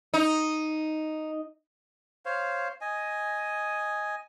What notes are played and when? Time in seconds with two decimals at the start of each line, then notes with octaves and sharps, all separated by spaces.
0.14 D#4
2.25 C5 C#5 F5
2.81 D#5 G#5